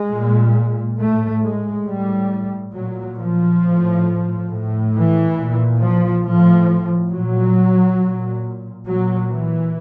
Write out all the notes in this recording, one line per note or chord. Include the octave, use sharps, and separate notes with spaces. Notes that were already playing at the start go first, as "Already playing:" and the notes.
Already playing: G#3
A#2
A2 A3
G#3
A2 G3
A#2 F#3
F3
A2
A2
E3
A#2
F3
A2 F3
A#2 F#3
A#2
A#2 F#3
E3